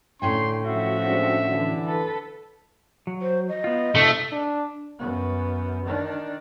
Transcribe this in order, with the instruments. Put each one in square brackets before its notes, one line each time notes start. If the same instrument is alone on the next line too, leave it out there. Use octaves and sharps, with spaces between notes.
[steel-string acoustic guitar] A2 C#4 G5 [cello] D3 [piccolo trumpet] C6
[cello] F3 F#4 [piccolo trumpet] E5
[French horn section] G#3 C4 D4
D3 E3
[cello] A4 B4
[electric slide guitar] F#3
[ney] C5
D#5
[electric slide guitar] B3 F4
[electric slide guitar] C3 D#4 F4 [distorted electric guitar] A3
[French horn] D4
[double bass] F#2 B3
D#3 D4